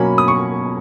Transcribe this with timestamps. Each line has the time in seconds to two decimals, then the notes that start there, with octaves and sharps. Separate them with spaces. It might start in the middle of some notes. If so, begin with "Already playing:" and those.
Already playing: B2 F#3 A#3 C#4 G#5 B5
0.18 D#6
0.28 C#6